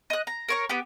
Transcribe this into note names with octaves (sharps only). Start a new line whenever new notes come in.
D#5 F#6
A#5
A#4 C#5 C#6
B3 G4